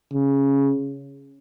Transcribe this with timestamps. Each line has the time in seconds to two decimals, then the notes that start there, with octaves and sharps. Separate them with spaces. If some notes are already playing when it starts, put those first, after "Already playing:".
0.13 C#3